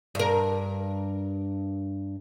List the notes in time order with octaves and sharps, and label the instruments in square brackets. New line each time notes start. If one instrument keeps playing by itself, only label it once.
[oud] G2 A#4